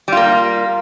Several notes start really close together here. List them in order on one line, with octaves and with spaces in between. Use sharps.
G3 F4 A#3